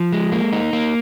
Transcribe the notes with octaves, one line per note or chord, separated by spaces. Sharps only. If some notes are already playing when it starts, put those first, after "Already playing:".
Already playing: F3
G#3
A#3
D#4
A#3